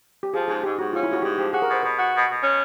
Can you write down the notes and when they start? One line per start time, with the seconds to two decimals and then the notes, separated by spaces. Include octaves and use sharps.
0.23 G4
0.33 F3 G#4
0.48 G#2 G#4
0.63 G#2 G4
0.78 G#2 F#4
0.93 C#4 F4
1.03 E4
1.09 G#2 F#4
1.22 G#2 G4
1.38 F3 G4
1.53 F#4 G#4
1.62 A#4
1.68 B2 C5
1.83 B2 B4
1.97 F#4
2.13 B2
2.28 B2
2.42 C#4